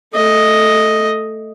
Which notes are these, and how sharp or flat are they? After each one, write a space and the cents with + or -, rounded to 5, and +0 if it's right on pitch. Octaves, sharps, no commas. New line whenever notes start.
A3 +0 D#5 +0